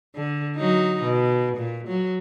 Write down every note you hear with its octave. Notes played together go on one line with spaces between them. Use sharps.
D3
F#3 D#4
B2
A#2
F#3